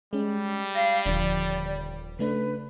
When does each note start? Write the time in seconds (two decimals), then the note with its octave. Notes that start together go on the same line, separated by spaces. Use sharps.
0.13 G3 G#3 C#4
0.75 F5 A#6
1.06 D#1 D3 F3 D5
2.19 C#3 A3 D4 B4